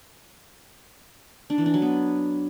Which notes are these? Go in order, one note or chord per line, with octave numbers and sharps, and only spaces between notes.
D4
E3
D4
F#3
B3